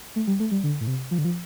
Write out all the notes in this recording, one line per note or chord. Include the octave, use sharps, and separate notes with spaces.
A3
G3
A3
G3
D3
A2
C3
F3
D3
F3